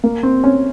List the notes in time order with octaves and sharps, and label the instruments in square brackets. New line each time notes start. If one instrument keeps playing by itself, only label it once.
[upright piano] A#3
C4
C#4